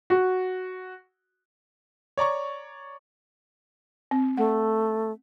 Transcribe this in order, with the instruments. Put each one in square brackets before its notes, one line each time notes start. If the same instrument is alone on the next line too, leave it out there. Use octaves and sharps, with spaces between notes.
[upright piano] F#4
[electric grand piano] C#5 D5 A#5 C#6
[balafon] C4
[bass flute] A3 [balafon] F#5